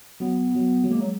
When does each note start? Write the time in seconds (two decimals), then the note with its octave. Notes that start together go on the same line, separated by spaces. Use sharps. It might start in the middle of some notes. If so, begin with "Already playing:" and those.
0.20 F#3 B3
0.55 F#3
0.84 F#3
0.90 G#3 A#3
1.01 F#3